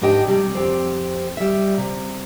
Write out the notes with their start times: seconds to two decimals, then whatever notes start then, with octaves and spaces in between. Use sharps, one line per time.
0.02 G#2 D4 G4 D#5 G5
0.28 C3 G3 G4
0.53 F2 C4 G4
1.37 G3 E5
1.78 C3